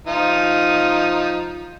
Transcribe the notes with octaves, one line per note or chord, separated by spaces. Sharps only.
F3 D#4 F4